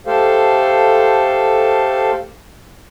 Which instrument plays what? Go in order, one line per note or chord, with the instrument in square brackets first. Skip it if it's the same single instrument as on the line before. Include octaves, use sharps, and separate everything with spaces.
[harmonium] A3 G4 A4 C5 F5